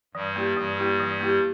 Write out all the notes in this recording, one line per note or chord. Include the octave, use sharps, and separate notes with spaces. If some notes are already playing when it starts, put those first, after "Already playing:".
G2 E3 G3
A#3 E4 G4
G2 E3 G3
A#3 E4 G4
E3
A#3 E4 G4